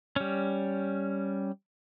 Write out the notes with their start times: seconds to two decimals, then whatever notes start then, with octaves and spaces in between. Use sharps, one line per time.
0.16 G3 C#4